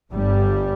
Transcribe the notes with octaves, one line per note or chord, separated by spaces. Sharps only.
G1 G2 G3